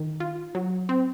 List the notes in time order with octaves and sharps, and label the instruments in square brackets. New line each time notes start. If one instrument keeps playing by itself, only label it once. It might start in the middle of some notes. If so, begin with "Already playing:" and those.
Already playing: [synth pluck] D#3
F4
F#3
C4